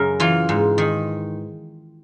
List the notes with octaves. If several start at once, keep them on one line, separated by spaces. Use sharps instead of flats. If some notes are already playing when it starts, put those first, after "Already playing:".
Already playing: F#2 C#3 A#4
E3 F4
G#2
D#3